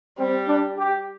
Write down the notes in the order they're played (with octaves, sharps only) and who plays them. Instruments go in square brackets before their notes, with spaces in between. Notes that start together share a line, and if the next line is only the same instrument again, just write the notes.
[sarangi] G3 [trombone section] C4
[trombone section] D4
G4